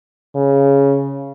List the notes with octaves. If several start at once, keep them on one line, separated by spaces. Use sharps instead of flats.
C#3